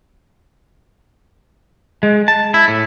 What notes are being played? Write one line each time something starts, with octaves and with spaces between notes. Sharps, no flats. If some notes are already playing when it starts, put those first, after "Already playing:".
G#3
A5
E4
A2